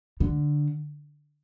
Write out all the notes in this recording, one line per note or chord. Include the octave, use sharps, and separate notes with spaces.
D3